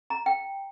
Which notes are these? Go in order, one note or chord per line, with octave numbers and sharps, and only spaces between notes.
A#5
G5